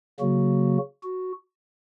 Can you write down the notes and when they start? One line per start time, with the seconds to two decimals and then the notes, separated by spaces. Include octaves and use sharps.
0.20 C#3 F#3 A#3 F#4
1.03 F#4